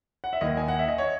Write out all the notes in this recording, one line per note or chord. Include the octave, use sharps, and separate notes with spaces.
F#5
E5
D#2 D#3 D#5
G#5
F#5
E5
D#5
C#5